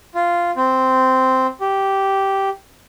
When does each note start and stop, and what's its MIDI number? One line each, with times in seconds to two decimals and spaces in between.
0.15 0.51 65
0.57 1.47 60
1.61 2.49 67